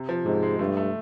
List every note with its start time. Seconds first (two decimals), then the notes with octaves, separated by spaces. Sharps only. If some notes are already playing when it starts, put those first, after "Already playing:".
Already playing: C3
0.09 F3
0.25 G#2 C3
0.43 G#3
0.59 G2 A3
0.77 A3